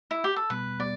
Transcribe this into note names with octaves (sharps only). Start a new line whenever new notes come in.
E4
G4
A4
B2 G3 B3 B4
G3 B3 D5